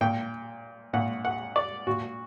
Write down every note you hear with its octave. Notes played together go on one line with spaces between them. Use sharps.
A#2 G5
A#2 F#5
F#5
D5
A#2 F#4